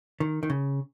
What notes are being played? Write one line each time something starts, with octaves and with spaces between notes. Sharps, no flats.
D#3
D#3
C#3